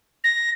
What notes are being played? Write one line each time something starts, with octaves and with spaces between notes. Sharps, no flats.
A#6